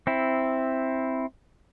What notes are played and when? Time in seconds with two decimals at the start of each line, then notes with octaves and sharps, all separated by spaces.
0.07 C4 E4